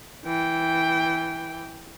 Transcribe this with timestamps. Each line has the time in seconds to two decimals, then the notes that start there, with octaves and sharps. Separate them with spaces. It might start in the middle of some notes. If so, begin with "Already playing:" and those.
0.25 E3 G5